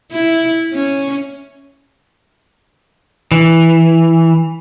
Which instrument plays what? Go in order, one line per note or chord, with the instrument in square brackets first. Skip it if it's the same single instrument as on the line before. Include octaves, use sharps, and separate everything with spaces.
[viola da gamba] E4
C#4
[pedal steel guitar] E3